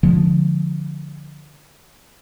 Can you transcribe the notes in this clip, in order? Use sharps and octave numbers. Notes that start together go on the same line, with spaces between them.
D3 F3 G#3